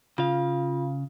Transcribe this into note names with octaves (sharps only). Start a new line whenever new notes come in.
C#3 F4 F5